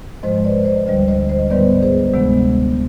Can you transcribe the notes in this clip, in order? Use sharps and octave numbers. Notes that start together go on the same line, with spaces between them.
G#2 F3 G#3 C5 D#5
B4 D5
C5 D#5
D2 D3 G3 C5 D#5
C5 D#5
C5 D#5
G#2 D#3 G3 B3 B4 D5
G#4 C5
D2 C3 D#3 G#3 B3